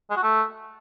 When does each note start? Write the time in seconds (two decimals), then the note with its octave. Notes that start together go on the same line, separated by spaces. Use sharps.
0.10 G#3
0.16 F#4
0.23 A3